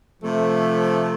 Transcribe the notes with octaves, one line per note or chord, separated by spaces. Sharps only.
C3 F3 A3